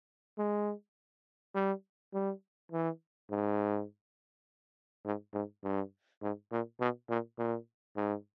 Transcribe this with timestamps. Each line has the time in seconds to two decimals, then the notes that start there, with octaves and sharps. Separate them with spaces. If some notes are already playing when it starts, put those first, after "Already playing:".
0.38 G#3
1.55 G3
2.14 G3
2.72 E3
3.31 G#2
5.05 G#2
5.34 G#2
5.63 G2
6.22 G#2
6.52 A#2
6.80 B2
7.10 A#2
7.38 A#2
7.96 G#2